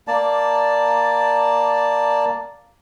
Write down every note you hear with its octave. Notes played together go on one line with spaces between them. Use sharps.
A#3 D5 A5